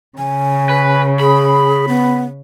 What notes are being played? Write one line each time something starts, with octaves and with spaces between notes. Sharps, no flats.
C#3 G#5
B4
G#4 B5
B3